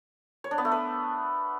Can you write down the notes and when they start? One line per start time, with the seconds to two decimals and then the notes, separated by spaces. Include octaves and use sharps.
0.44 C#5
0.51 D4
0.58 B3
0.65 A3
0.72 B4